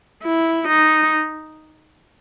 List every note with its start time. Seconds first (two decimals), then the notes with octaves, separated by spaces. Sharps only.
0.23 E4
0.68 D#4